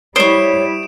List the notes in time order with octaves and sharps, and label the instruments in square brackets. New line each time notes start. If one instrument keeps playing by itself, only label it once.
[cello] G3 E4 [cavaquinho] C5 C#6 [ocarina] C#5 [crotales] D#6 D7 E7